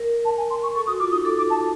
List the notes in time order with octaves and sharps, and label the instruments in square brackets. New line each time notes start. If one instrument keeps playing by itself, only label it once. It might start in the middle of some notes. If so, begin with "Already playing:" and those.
Already playing: [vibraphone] A#4
[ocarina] A5
G#5
C6
C#6
[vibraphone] A4 [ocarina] C#6
[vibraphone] F#4 [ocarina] D#6
[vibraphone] F4 [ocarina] D6
[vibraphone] D#4 [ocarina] D#6
[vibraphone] A4 [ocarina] D6
[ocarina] D6
A5